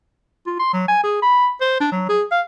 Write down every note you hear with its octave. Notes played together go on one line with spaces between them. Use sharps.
F4
C6
F#3
G#5
G#4
B5
C5
D4
F#3
G#4
F5